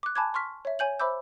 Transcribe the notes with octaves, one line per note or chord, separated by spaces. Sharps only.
D6 F#6
G#5 A5 B5 D6 F#6 G#6
C6 C#6 F6 B6
C#5 E5
C#5 G#5 G6 F#7
C5 E5 B5 D6 E6 G6